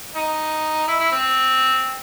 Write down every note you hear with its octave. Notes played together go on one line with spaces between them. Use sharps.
D#4
E4
E4
C4